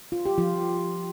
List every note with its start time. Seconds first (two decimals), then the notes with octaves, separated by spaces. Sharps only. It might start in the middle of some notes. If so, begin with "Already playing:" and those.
0.12 F4
0.26 G4
0.38 F3 F4